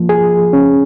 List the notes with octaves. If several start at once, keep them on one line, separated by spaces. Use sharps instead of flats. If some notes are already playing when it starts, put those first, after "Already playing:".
Already playing: F3 A#3
G#4
C#4